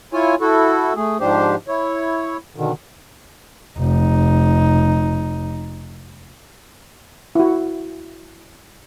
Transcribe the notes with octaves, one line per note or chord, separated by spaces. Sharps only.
E4 F4 C#5 G#5
E4 F#4 A4
A3 G#4
G#2 F3 D4 G4 C5
E4 C#5
B2 D3 D#3
F1 D#4
E4 F#4